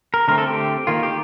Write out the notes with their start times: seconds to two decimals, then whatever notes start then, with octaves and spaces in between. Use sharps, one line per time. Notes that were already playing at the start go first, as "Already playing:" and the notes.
0.14 A#4
0.28 D3 A3 C4 A#4
0.38 A4
0.47 G4
0.87 D#3 A#3 F4
1.03 G4